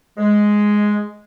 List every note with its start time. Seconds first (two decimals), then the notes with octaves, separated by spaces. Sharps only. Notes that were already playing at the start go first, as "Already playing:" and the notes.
0.18 G#3